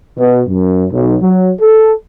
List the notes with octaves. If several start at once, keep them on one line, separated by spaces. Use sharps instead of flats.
B2
F#2
B1
F#3
A4